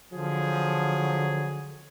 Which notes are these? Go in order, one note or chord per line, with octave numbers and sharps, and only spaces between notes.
D3 F3 F#3 G#4